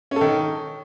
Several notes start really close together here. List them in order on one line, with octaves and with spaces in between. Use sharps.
C#4 A4 D#3